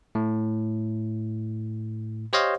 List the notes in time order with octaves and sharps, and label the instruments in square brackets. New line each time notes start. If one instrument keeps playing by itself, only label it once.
[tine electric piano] A2
G4 C5 C#5 D#5 F5